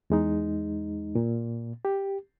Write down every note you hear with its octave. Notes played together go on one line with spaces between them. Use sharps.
E2 G#3 D#4
A#2
G4